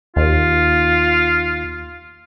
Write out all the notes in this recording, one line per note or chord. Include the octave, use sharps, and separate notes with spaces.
D#2 F4